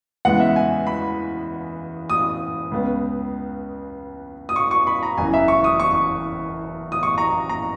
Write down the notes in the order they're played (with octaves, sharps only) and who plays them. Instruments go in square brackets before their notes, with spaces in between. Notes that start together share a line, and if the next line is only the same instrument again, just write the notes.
[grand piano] E2 C#3 G#3 B3 F#5
E5
G#5
B5
D#6
C#2 C#3 G#3 B3
D#6
C#6
C#6
B5
A#5
F#1 E2 C#3 E3 G#5
E5
C#6
D#6
C#6
D#6
C#6
A#5
A#5